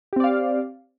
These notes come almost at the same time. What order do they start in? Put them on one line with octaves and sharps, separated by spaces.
G4 C4 D5 F5